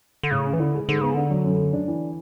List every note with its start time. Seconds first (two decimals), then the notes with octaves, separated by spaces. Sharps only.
0.23 D3
0.31 A2 C#3
0.46 C#4
0.53 E3
0.59 D3 E4
0.74 G#3
0.88 G#2 D3
1.01 C#3 B3
1.14 D3 D4
1.30 F#3
1.44 F#2
1.58 A3
1.73 D4
1.88 E3